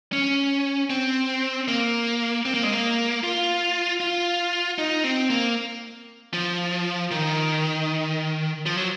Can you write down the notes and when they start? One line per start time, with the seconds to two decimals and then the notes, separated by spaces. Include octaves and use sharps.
0.13 C#4
0.90 C4
1.68 A#3
2.46 C4
2.54 A#3
2.63 G#3
2.73 A#3
3.24 F4
4.00 F4
4.78 D#4
5.04 C4
5.30 A#3
6.34 F3
7.11 D#3
8.66 F3
8.77 F#3